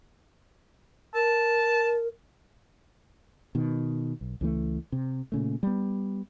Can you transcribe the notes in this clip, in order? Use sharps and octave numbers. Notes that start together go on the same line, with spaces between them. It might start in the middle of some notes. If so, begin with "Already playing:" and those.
A#4 A5
B2 D#3
B1
C#2 E3 A3
C3
A#2 C#3 A3
G3 B3